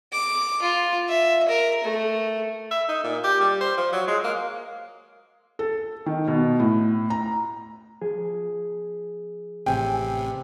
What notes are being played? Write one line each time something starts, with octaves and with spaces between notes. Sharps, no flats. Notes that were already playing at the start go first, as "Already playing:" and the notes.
D6
F4
E5
A#4
A3
E5
D#4
A#2
G4
G3
C5
F3
F#3
G#3
A#3
A4
D#3
B2
A2
A#5
F3 G#4
A1 C3 G5 G#5